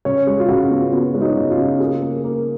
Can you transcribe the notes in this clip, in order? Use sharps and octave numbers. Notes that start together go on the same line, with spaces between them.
C#3 C#5
G#3
F4
C#3 F#4
B3
B3 F4
G#3 C#4
D#4
C#3
F4
C#3
A#3 G#4
A#3
A#3